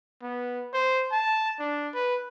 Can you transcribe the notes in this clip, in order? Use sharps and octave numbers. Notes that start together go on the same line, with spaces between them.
B3
C5
A5
D4
B4